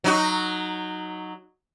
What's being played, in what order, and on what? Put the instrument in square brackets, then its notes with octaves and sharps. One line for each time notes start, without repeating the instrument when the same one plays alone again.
[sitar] F#3 D#4 F#4